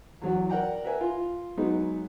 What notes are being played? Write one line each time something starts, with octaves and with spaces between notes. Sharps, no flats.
E2 F#3 F#5
A#4 D5 F#5 G5 A#5
A#4 B4 E5 G#5
F4
F#3 G#3 B3 D#4